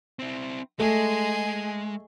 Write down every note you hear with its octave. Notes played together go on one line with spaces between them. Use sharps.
C4 E4
G#3 A3 G#4 D#5